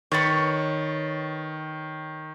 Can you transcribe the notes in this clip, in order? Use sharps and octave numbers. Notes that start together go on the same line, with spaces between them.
D#3 B4 C#5 A6